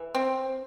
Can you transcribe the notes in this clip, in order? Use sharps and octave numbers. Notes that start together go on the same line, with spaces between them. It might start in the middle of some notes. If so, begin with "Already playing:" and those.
Already playing: E3
C4